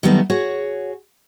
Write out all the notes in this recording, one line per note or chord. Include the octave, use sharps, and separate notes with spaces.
D#3 F#3 G3 A3 B3 D#4
F#4 G#4 C#5 F#5